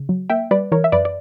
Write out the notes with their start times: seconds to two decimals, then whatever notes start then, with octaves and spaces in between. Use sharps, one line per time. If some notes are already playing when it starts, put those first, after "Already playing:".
Already playing: C#3
0.09 F#3
0.30 A#3 E5 G5
0.51 G3 B4 D5
0.72 E3 A#4 C#5
0.84 E5
0.92 F#2 B4 D5
1.05 D5